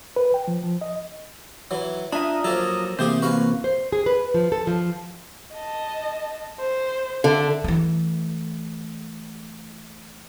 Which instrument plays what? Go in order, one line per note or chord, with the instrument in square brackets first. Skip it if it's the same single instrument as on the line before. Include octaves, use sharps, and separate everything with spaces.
[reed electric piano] B4
G5
F3
F3
D#5
[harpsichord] E3 F#3
[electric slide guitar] D4 E5 [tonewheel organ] F4 A#5 D#6 [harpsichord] G#5
[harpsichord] F3 A#3 A4 [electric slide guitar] F#3
[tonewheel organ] C3 E3 C4 [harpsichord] A3 G4 G#4 [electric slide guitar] A#3 C5
[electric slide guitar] A#3 F#4 [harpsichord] B4 F5
[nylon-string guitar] C5
G#4
B4
F3
A4
F3
[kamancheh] D#5 A5
C5
[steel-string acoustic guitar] D3 [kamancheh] E5 A5
[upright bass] E3 A3